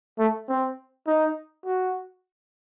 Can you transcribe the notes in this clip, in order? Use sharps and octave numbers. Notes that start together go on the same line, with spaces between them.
A3
C4
D#4
F#4